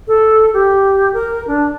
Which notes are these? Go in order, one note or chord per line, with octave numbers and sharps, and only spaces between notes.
A4
G4
A#4
D4